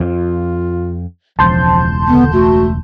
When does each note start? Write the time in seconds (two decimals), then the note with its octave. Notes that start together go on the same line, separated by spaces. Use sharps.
0.01 F2 F4
1.39 E1 C#2 F3 A5 C6 G6
2.08 D3 B3
2.33 A3 F#4